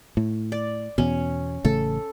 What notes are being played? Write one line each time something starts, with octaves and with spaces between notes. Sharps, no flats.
A2
D5
E2 B2 C#4
A1 C#3 A3 A4